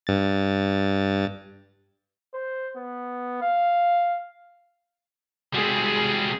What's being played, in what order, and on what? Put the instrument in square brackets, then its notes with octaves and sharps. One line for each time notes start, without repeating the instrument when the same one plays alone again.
[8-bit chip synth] G2 A6
[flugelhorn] C5
B3
F5
[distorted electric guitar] G3 C4 [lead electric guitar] G#3 F#4 [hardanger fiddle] G#4